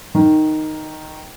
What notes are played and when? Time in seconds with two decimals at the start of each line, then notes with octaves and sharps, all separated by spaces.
0.15 D#3